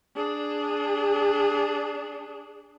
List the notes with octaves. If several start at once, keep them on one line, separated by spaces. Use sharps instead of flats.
D4 G#4